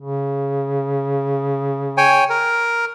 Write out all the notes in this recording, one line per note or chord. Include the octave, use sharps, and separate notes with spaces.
C#3
C#5 G5 G#5
A#4